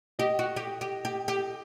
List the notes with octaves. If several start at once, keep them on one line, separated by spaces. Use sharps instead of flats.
G4 D#5
F#4
G4
G4
G4
G4